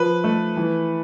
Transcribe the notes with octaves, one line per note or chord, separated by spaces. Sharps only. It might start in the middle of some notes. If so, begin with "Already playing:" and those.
Already playing: F3 B4
A3
E3